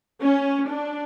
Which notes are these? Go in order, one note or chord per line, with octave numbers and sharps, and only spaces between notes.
C#4
D4